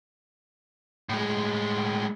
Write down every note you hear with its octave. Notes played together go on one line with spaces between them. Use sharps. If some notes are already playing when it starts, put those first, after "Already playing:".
A2 G#3